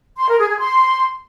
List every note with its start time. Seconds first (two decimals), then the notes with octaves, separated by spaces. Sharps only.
0.18 C6
0.28 A#4
0.39 G#4
0.49 G#4
0.59 C6